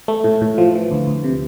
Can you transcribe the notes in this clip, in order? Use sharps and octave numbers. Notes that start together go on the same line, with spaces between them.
A3
A2
A2
F3
E3
D2
D2
C3